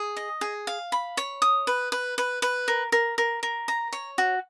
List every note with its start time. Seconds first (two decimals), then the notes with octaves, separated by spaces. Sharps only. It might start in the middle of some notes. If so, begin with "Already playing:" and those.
Already playing: G#4
0.17 D#5
0.41 G#4
0.67 F5
0.92 B5
1.17 C#5
1.42 D#6
1.67 B4
1.92 B4
2.18 B4
2.42 B4
2.68 A#4
2.92 A#4
3.18 A#4
3.43 A#4
3.68 A#5
3.93 C#5
4.18 F#4